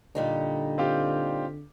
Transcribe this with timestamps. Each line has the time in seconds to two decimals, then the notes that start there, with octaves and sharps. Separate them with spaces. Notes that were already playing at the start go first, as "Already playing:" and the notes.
0.15 A#2 D3 G3 D#4
0.78 C4 F4 G4